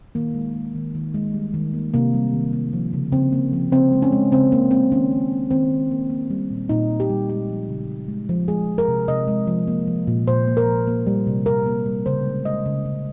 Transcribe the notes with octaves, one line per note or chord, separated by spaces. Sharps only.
D#3 A#3
G#3
G#3
D#3
D#3
G#3
G3
D#3
A#3
C3 A#3
G3
D#3
A#3
F3
C#3
C#3 C4
A#3
F3
C#3 C4
G#3
C#4
G#3
C#3 C4
C#3 A#3
G#3 C4
D#3 C#4
A#3
A#3
D#3 C4
D#3
A#3
A#3
G3
A#2
A#2 D#4
A#3
G4
G3
G#3 G4
F3
C#3
C#3
G#3
F3
G#3 G#4
F3
A#4
C3
C3 D#5
G#3
F3
A#3
F3
A#2
A#2 C5
A#3
A#4
F3
A#3
G3
C3
C3 A#4
A#3
G3
C#3 C5
G#3
G#3 D#5
C#3
C#3